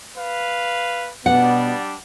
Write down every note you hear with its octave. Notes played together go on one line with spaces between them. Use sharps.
B4 F5
B2 G3 B3 D4 F#5